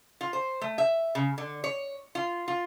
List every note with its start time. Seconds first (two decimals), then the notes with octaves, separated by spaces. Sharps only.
0.21 F4
0.33 C5
0.61 A3
0.78 E5
1.15 C#3
1.38 D3
1.64 C#5
2.15 F4
2.48 F4